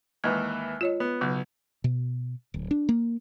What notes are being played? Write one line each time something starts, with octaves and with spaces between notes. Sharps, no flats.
D#2 E3 G#3
F4 C#5 D#5
B3
B1 C#3 F#3
B2
D1
D4
A#3